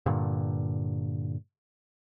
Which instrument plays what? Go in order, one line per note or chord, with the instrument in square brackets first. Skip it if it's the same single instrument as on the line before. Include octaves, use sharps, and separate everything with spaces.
[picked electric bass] G2 A#2 D3